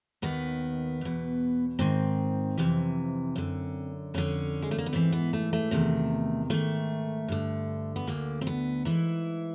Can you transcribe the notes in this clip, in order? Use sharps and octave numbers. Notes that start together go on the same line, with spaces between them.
D#2 D#3 B3
E2 B2
G#2 D#3 C4
F2 C3 E3
F#2 D3
F2 D3 C#4
G#3
A3
A#3
B3
G#2 E3 C4
B3
A3
A3
E2 C3 D#3
G#2 D#3 A3
G2 D3
B3
D2 D3 A#3
C4
B3
G#2 E3 E4